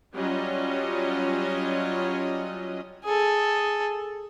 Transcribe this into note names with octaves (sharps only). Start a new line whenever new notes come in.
F#3 G3 C#4 F4 D#5
G#4 A4